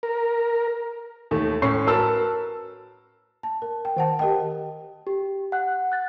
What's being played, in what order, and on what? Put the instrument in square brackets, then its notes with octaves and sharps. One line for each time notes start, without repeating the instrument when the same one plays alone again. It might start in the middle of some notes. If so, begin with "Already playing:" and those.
[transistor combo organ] A#4
[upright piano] D#2 A3
A2 C#4 C#6 C7
F#4 A#4 B4 A5 E6
[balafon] A5
A#4
G5
D#3 F#5 A5
G4 A#4 D#5 G5
[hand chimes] G4
F#5 F#6
F#6 A6